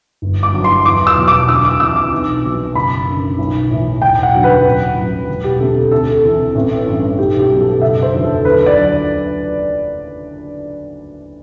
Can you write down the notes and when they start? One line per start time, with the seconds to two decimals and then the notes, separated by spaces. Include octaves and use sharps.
0.22 G1
0.43 D6
0.53 G2 F#3
0.64 C6
0.85 E2 D6
1.07 E6
1.17 B2 F#3
1.28 D6
1.48 D2 E6
1.65 D6
1.80 C3 E3 E6
1.96 D6
2.12 B1
2.44 B2 F#3
2.75 F#1 B5
3.07 F#2 D3
3.38 B1
3.70 A2 E3
4.02 E1 G5
4.23 F#5
4.34 D2 D3 F#3
4.44 B4
4.65 A1
4.97 A2 F#3
5.29 E1
5.44 G4
5.60 D2 C3 A4
5.91 D2 A4
6.23 C3 E3
6.55 A1
6.87 G2 E3
7.18 B1 G4
7.39 G4
7.50 B2 F#3
7.60 A4
7.81 F#1 E5
8.02 C5
8.13 E2 D3 F#3
8.24 A4
8.45 D2 B4
8.66 D5
8.77 D3 F#3